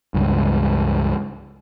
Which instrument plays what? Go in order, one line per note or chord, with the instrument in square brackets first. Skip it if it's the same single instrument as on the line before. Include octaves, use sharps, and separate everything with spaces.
[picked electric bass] C#2 G2